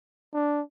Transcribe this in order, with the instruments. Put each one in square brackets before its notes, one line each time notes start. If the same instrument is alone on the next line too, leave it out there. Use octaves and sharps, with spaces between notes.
[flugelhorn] D4